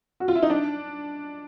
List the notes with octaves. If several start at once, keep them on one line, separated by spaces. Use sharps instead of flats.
F#4
F4
E4
D#4
D4